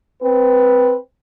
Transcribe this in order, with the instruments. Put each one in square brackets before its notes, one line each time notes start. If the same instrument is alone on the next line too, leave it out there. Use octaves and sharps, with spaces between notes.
[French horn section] C4 B4